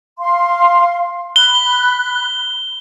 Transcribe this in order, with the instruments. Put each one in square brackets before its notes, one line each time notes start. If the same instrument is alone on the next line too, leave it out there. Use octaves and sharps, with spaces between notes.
[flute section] F5 C6
[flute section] B5 F#6 [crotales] G7